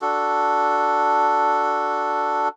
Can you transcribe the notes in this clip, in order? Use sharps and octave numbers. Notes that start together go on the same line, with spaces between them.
D4 F#4 A4